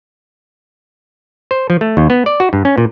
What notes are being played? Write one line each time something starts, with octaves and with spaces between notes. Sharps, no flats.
C5
F3
A3
D#2
B3
D5
F#4
G2
C#4
A#2